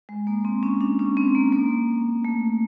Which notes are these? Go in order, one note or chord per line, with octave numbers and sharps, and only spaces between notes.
G#3
A#3
C4
C#4
D4
C#4
C4
A#3
A#3
A3